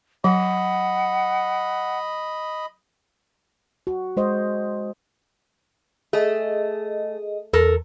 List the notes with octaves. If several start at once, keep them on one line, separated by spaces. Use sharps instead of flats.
F#3 D#5 F#5 B5
F#4
G#3 C5 D#5
A3 G#4 D#5
E2 A4 A#4